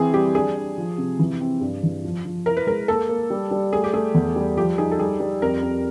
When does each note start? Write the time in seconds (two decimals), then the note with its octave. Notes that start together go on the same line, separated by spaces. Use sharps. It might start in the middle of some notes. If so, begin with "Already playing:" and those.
Already playing: E3 C4 G#4
0.14 G3 G4
0.35 D4 G#4
0.56 D4
0.78 F3
0.98 C3
1.19 E3
1.41 C4
1.61 G2
1.83 E3
2.04 F3
2.25 F3
2.46 E4 A#4
2.57 B4
2.67 G#3 A#4
2.88 A#3 A4
3.09 A#3
3.30 G3
3.51 G3
3.73 A3 G#4
3.84 G4
3.93 A3 G#4
4.14 E2
4.36 G3
4.57 F3 G4
4.78 D#4 G#4
4.91 A4
4.99 G3 G#4
5.20 G3
5.42 F2 A#4
5.63 F2